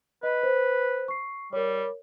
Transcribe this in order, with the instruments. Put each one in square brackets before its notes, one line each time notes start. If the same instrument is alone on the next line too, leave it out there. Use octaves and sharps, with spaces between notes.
[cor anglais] B4 [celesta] D#5
[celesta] C5
C#6 C7
[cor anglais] G3 [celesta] A#4 C#5